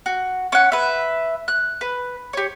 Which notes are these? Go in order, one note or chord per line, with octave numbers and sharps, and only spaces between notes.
F#4
C#4 F#5
B4 E5
F#6
B4
G4 C#5